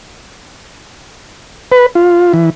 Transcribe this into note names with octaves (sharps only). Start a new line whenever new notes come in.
B4
F4
E3